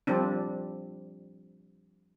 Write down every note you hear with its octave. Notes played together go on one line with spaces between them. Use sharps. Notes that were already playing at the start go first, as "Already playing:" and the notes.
F3 G3 C4 D4